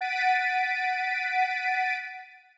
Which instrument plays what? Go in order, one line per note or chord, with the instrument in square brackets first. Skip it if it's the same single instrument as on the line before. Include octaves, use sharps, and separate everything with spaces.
[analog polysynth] F#5 A6 B6 D7 D#7